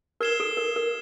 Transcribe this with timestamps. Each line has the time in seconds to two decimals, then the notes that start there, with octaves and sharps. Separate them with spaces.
0.21 A#4 F6 G#6 C7 E7 G7
0.40 A4
0.57 A#4
0.76 A#4